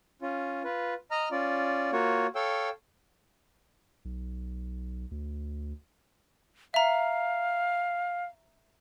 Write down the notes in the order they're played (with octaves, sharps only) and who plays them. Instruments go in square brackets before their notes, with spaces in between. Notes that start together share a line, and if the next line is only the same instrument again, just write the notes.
[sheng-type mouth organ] C#4 F4
F4 B4
D#5 A#5 F6
C#4 F4 D5
A#3 F4 F#4 C#5
A4 C#5 F5 G5 E6
[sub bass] B1
D2
[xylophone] E5 A#5 [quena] F5